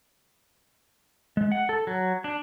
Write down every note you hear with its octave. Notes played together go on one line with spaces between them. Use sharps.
G#3
F#5
A4
F#3
D4